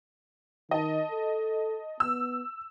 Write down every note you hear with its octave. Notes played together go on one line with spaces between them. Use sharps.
D#3 D#5 A5
A4
B3 E6